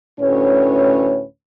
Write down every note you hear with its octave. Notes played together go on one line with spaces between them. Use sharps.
D2 A2 C#4 B4 C#5